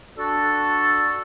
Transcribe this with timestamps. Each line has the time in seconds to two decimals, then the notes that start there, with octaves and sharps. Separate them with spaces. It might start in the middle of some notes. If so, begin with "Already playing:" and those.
0.17 D4 F#4 A4